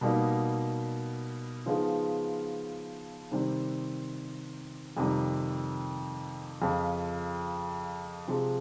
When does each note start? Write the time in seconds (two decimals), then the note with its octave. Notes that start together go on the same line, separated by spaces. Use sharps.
0.01 B2 G3 A#3 D#4
1.66 C#3 F3 G#3 B3 D#4
3.31 C3 D#3 G3 C4
4.97 F2 C3 D#3 G3
6.62 F2 C#3 F3
8.28 C3 F3 G#3